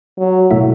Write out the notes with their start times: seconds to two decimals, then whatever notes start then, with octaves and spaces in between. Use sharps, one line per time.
0.19 F#3
0.51 B2 A3 E4